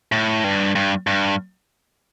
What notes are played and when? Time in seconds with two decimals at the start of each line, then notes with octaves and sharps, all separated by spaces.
0.12 A2
0.44 G2
0.75 G2
1.07 G2